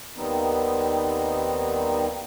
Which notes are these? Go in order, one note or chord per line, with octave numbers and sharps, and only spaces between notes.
D#2 D#3 G3 B3 C4 D#4